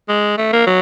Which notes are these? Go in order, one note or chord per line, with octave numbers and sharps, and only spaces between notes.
G#3
A3
A#3
F#3